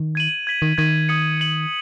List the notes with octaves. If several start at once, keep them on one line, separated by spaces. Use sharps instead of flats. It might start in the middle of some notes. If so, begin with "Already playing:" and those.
Already playing: D#3
G#6 D#7 F#7
G#6 B6 F#7
D#3
D#3 G#6 B6 D#7
D#6 G#6 C#7 F#7
G#6 C#7 F#7